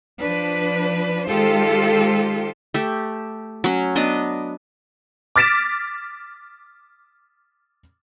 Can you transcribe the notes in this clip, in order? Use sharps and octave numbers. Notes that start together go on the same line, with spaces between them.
F3 D4 B4
D#3 G#3 F4 G4 A4 C5
A3 G4
F#3 C#4
B3 D4 D#5
D6 F6 A6 B6 D7 E7